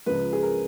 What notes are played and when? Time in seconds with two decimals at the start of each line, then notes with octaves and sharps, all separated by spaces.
0.06 C#2 C#3 F3 G#3 B4
0.33 G#4
0.43 A#4